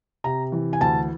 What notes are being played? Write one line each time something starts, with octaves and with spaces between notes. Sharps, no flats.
C3 A#5
E3
G#5
D2 A5